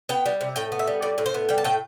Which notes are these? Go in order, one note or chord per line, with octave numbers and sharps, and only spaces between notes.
B3 G5
G3
C3
A2 G5
B3
E5
G3
A2 D5
A2
C5
B3
G3 G5
A5
A2 G5